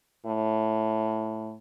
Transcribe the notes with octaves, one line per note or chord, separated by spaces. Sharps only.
A2